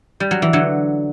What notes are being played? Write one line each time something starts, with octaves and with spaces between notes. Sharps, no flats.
G3
F#3
E3
D3 F#3